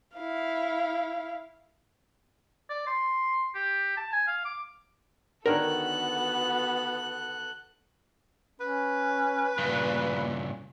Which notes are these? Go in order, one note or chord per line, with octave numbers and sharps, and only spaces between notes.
E4 F5
D5
C6
G4
A5
G#5
F5
D6
D3 D#3 B3 F#4 A4 A#4 C#5 F#6
C#4 B4
G2 A#2 C#3